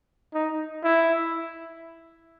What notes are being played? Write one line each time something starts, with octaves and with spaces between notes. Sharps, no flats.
D#4
E4